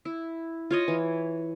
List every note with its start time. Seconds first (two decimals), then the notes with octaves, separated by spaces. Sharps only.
0.05 E4
0.71 F4 C#5 D#5
0.88 E3